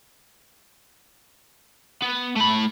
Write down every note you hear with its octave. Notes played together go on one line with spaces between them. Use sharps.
B3
A3 B5